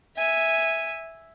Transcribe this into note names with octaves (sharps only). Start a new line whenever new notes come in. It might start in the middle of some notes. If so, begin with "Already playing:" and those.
E5 G#5